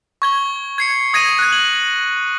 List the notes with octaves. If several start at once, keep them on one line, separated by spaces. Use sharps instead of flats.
C#6 G#6 G7
G#6 C7 C#7
D#6 G#6 A#6 D#7
F#6 G#6
F#7